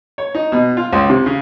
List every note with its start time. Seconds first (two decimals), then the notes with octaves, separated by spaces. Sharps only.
0.18 C#5
0.35 D#4
0.52 B2
0.77 F4
0.93 C#2
1.10 C3
1.26 C#3